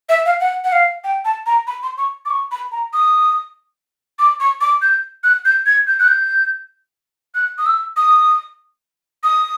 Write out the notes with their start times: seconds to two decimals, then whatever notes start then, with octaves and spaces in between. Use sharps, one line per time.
0.09 E5
0.26 F5
0.41 F#5
0.64 F#5
0.72 F5
1.04 G5
1.25 A5
1.46 A#5
1.67 B5
1.83 C6
1.98 C#6
2.26 D6
2.30 C#6
2.52 B5
2.72 A#5
2.93 D#6
4.19 D6
4.40 C#6
4.61 D6
4.82 G6
5.24 F#6
5.45 G6
5.66 G#6
5.87 G6
6.00 F#6
6.08 G6
7.35 F#6
7.58 D#6
7.66 E6
7.97 D#6
9.24 D#6